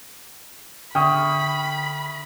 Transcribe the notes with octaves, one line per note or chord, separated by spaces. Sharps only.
D3 E5 G5 B5 C#6 D#6 F6